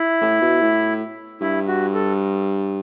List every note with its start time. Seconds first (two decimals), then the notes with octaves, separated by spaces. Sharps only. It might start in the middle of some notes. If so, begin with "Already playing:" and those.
Already playing: E4
0.22 A2
0.42 B2
0.61 A2
1.41 G2 E4
1.68 F#4
1.94 A4